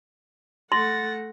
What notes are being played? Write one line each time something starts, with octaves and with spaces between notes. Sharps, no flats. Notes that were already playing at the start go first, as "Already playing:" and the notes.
A3 F#5 C6 A6 A#6